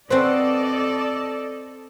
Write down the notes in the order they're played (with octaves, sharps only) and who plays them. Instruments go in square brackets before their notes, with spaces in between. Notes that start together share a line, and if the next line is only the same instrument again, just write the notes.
[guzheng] C4 F#4 B4 [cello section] A4 [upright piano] C5 [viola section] D5 D#5